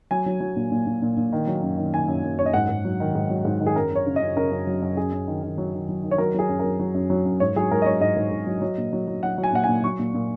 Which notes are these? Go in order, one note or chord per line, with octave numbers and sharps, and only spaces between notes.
F#3 G#5
F#3
F#3
A#2
A#2
A#2
A#2
A#2
D#3
F#3
F#2
D#3
D#3 G#5
F#2
F#2
F#2 C#5
D#5
G#2 F#5
G#2
F#3
D#3
G#2
F#3
G#2
D#3
G#4
F#2 A#4
F#2 C#5
C#3
D#5
F#2
C#3 A#4
F#2
F#3
F#2
F#2 G#4
F#2
D#3
D#3
F#3
D#3
F#3
D#3
C#5
F#3 A#4
F#3 G#4
F#2
F#3 A#4
F#3
F#2
F#3
F#2
G#2 C#5
F#3 G#4
G#2 A#4
D#5
F#3 C#5
G#2 D#5
G#2
G#2
F#3
F#3
A#2
F#3
F#3
F#3 F#5
F#3
G#5
A#2 F#5
A#2 G#5
F#3 C#6
A#2
A#2